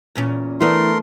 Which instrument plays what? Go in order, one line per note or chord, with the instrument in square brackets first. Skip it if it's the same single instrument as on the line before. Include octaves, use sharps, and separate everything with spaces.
[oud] E2 A#2 C#4
[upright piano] E3 E4 [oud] A3 B3 D4 [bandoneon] A#4 C6